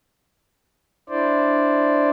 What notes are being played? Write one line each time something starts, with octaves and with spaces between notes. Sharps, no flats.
D4 E4 C5 D5